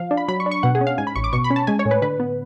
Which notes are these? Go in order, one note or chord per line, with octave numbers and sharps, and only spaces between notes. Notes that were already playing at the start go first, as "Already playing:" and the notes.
Already playing: F3 F5
D4
B5
F#3 B5
C#6
D4
C#6
B2 F#5
G#4
C#4
F5
G#2 G#5
B5
A1 C#6
D6
B2 C#6
B5
C#4
A5
G#3 G#5
C#5
A2
B4
D3 B4
B3